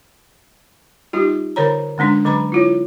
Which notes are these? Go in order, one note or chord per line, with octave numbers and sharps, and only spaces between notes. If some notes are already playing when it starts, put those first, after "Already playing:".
G3 D#4 F4 G4
D3 A#4 C5 C#5 A#5
D3 G#3 C#4 D4
D3 F#3 B4 A#5 B5
E4 F4 C#5